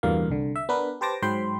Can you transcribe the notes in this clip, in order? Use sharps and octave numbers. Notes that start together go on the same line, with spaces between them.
E2 G2 B2 D3 A#3 F5
C2 D3
E5
B3 D4 A#4 B4
G4 B4 C5 A5 D6 A#6
G#2 F#3 C5 G5 B5 C6